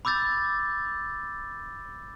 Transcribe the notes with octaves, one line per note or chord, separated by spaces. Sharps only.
B5 D6 E6 G6 A6